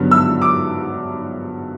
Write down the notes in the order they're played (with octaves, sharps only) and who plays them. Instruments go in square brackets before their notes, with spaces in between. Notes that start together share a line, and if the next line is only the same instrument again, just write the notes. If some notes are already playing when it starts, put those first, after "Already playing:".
Already playing: [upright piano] G2 D3 F#3 B3
E6
D6